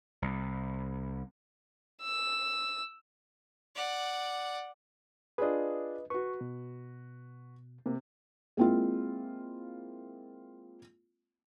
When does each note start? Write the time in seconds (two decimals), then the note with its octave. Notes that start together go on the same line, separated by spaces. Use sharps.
0.22 C2
2.03 E6
3.75 D5 F#5
5.38 D4 F4 G#4 B4 D#5
6.10 F#4 B4 C#6
6.41 B2
7.86 C3 A#3
8.57 G#3 A#3 C4 E4 F4